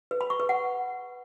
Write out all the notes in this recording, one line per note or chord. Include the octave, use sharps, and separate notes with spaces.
B4
B5
C#6
B4
F#5